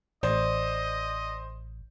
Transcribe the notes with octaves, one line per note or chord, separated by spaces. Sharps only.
A1 C5 D5 D#5